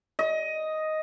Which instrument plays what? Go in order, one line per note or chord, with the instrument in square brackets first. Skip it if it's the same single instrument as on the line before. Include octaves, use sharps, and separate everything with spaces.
[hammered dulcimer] D#5